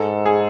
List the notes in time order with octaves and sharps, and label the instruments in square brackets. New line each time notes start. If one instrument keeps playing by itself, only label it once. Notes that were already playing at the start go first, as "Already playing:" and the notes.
Already playing: [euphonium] G#2 [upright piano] A4
[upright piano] G#4